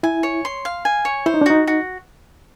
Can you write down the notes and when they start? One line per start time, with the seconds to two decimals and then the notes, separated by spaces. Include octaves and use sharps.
0.03 E4 G#5
0.23 C#5
0.45 C6
0.65 F5
0.85 G#5
1.05 C#5
1.26 E4 C5
1.34 D#4
1.41 D4
1.46 D#4 F#4
1.67 F#4